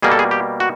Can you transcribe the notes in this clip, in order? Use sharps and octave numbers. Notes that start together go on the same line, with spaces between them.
B2 G3 A#3 G#4
A4
G#4
G4
F#4